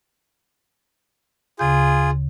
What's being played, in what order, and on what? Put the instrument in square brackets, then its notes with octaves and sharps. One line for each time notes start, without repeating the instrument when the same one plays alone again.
[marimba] D2 C#3 G6 [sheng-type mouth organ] F4 G#4